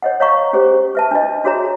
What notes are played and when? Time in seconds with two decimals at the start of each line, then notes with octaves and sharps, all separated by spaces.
0.02 C#5 D#5 F#5
0.20 C#5 D#5 F5 A#5 C#6
0.53 C#4 G4 G#4 C5
0.95 B4 E5 A5
1.11 D4 F4 D#5
1.44 D4 F#4 G#4 C#5 E5 A#5